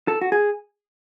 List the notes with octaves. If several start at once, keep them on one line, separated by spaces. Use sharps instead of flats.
A4
F#4
G#4